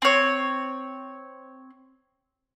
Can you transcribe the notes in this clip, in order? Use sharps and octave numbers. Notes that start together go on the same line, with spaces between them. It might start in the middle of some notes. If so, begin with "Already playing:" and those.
C4 C#5